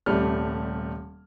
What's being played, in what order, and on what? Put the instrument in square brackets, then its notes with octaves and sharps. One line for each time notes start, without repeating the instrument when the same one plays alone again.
[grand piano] D#1 C3 G3 A3 F6